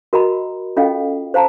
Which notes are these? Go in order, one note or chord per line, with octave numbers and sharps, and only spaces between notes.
F#4 A#4 D#5 F#5 A#5 B5
C#4 F4 A4 D#5 F5 G5
C5 F5 A5 A#5